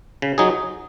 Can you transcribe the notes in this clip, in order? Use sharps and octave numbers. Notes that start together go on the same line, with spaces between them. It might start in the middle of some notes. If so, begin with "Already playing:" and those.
C#3
F#3 D#4 G#4